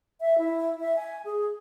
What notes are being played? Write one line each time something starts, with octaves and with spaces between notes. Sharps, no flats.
E5
E4
E5
G#5
G#4